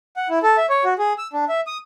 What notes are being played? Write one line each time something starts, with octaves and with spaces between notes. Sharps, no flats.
F#5
E4
A4
E5
C#5
F#4
G#4
E6
D4
E5
D#6